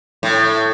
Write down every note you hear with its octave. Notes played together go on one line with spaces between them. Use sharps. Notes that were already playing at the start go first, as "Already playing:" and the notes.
A2